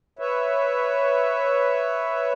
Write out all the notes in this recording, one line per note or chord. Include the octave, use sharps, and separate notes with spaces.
B4 C#5 E5